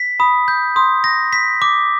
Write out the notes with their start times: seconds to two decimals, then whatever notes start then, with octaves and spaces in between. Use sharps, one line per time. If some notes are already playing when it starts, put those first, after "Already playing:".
Already playing: B6
0.20 B5 D#6
0.48 G6
0.76 C6 D#6
1.04 A#6
1.33 B6
1.62 D6